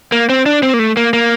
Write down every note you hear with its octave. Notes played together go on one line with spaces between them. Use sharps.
A#3
C4
D4
C4
A#3
A3
A#3
A#3